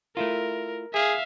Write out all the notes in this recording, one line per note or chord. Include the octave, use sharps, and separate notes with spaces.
A3 E4 F4 A#4
G#4 E5 F5